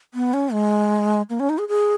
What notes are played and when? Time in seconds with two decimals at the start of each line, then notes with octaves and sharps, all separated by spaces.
0.14 B3
0.34 C#4
0.53 G#3
1.30 A#3
1.40 C#4
1.49 D#4
1.58 G#4
1.68 G#4